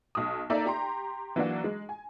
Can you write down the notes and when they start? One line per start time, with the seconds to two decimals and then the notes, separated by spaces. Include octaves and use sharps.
0.15 B1 D#6
0.50 A#3 D#4 A4 D5 E5 A#5
0.66 G4 A#5 C6
1.36 E3 F#3 A#3 D4 F#4
1.64 G#3
1.89 G#5